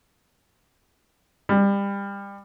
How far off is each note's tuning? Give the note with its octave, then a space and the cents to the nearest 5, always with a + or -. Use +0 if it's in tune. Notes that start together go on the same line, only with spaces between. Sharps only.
G3 +30